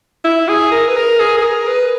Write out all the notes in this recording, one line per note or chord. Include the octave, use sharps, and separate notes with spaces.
E4
G#4
A#4
B4
A#4
G#4
G#4
A#4
B4